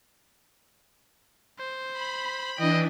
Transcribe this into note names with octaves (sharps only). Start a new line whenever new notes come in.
C5
B5
E3 D4 D#5 G5